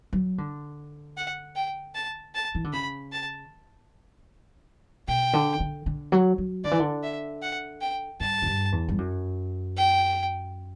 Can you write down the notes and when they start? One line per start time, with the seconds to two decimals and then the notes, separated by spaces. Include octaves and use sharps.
0.13 F#3
0.38 D3
1.17 F#5
1.56 G5
1.95 A5
2.35 A5
2.55 E3
2.64 D3
2.73 C#3 B5
3.12 A5
5.08 B2 G5
5.33 D3
5.60 D3
5.86 D3
6.12 F#3
6.38 F#3
6.64 D3 D5
6.71 E3
6.79 D3
7.03 E5
7.42 F#5
7.81 G5
8.20 G2 A5
8.42 F#2
8.46 G2
8.72 E2
8.89 G2
8.98 F#2
9.77 G5